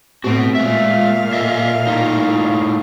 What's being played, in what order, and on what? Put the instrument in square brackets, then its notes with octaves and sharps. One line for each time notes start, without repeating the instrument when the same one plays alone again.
[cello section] A2 C4 [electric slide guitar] B3 F#4
[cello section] A#2 F5 [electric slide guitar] G#3 E5
[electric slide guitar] A4 D#5 E5
A2 D#4